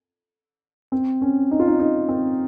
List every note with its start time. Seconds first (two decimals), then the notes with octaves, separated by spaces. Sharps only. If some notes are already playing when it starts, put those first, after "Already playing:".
0.92 C4
1.22 C#4
1.51 D#4
1.59 F4
1.68 D#4
1.79 D#4
2.09 C4